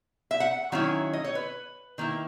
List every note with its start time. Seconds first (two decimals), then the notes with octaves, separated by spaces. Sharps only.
0.31 E5
0.40 F#5
0.72 D#3 F#3 C#4 E4
1.13 D#5
1.24 C#5
1.35 B4
1.98 D#3 A#3 E4